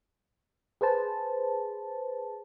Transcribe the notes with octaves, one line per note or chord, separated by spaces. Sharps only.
G#4 B4 C5 A5